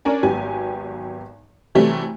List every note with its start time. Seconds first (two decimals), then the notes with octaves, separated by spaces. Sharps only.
0.05 C#4 D4 A#4 G#5
0.23 G#1 F#3 B3 G4 G#5
1.75 C3 E3 F#3 G3 A3 C4